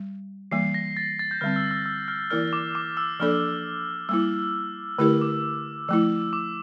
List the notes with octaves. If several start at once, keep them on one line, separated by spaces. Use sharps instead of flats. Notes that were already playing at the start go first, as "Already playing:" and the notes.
Already playing: G3
E3 G3 A#3 C7
A#6
A6
A6
G6
D3 G3 C4 F6
E6
E6
E6
F6
E3 A#3 E4 A#4 D5 F6
D6
D6
E6
F3 A#3 D4 A4 D5 F6
G3 A#3 E4 E6
D3 A3 E4 G4 A#4 E6
D6
F3 A3 E4 E6
D6